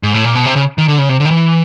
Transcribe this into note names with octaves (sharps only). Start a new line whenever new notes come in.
G#2
A2
A#2
B2
C3
C#3
D#3
D3
C#3
C3
D3
D#3
E3